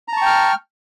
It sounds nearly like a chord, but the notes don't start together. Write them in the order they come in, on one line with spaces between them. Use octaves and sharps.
A#5 A5 C#6 G5 F6